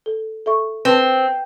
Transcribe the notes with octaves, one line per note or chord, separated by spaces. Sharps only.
A4
A4 E5 C#6
C4 B4